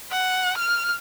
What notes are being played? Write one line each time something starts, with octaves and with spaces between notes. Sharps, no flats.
F#5
F6